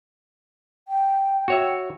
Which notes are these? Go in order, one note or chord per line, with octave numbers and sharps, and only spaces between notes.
G5
F#4 C#5 E5